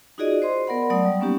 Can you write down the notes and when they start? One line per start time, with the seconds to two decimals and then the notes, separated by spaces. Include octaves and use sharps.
0.18 D#4 F4 F#4 G#4 D5 D#5
0.42 C5 D#5 C6
0.67 B3 A#4 D5 F#5 B5
0.90 F#3 A3 D5 F#5 D#6
1.05 G3
1.20 A#3 B3 C#4 D#4 G4